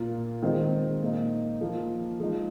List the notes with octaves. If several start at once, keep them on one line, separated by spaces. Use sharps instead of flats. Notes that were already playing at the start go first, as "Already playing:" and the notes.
Already playing: A#2 A#3 F4
D#3 G#3 C4 F4
A#2 A#3 D#4
F3 A#3 F4
F3 G#3 D#4